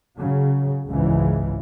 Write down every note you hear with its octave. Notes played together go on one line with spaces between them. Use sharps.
C#3 F#3
G#1 C#2 G#2 C#3 E3